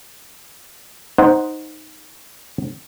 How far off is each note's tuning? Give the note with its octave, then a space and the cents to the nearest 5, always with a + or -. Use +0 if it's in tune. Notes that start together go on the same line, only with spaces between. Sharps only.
D#4 +0 C5 +0 F#5 +0